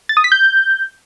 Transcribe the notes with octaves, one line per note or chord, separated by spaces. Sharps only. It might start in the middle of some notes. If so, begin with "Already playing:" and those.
A6
D#6
B6
G6